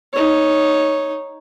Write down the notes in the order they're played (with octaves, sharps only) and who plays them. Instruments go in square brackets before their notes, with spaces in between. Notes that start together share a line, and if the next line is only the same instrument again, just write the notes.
[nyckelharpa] D#4 C#5